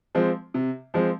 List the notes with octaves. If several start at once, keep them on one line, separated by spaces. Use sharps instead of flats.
F3 G#3 C4
C3
F3 G#3 C4